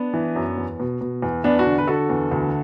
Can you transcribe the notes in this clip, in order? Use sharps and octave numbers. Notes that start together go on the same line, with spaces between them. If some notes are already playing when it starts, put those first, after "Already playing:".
Already playing: B3 D4
E3
F#2
E2
B2
B2
E2
E2 B3 D4
D4 F#4
D3
B4
D3 F#4 A4
E2
D2